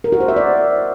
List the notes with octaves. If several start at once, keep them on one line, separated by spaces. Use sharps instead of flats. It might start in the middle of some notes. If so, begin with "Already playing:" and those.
A#4
F#4
C5
E5
D5